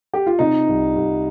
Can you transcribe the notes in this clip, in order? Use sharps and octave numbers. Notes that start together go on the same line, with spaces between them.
G4
F4
C3 D#4
C2
C2